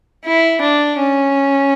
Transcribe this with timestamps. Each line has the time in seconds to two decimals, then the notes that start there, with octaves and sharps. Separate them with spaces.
0.25 E4
0.62 D4
0.99 C#4